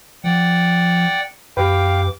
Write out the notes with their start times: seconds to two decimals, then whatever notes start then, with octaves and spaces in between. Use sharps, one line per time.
0.24 F3 D5 F#5 G5
1.57 F#2 G4 B4 F5 G5 D6